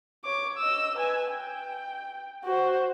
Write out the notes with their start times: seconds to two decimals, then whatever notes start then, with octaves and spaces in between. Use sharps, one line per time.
0.25 C#5 D6
0.58 D#5 E6
0.97 B4 G#5
1.33 G5
2.44 F#4 C5